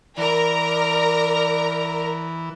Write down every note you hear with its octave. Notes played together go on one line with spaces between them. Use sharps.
E3 A#4 D5 A#5